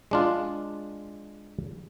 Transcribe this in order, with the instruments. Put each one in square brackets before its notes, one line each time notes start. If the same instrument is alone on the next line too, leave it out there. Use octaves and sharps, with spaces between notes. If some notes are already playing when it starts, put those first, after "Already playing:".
[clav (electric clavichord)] G#3 D4 F4